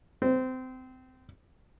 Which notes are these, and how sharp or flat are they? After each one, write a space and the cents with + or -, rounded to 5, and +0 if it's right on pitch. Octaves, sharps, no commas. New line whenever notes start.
C4 -25